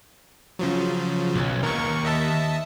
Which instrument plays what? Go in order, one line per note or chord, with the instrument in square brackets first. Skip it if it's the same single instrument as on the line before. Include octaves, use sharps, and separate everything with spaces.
[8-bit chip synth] C#3 F3 F#3
[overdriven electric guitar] B1
[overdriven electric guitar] D#2 [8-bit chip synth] A#4 C#6
[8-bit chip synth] D#5 E5 A5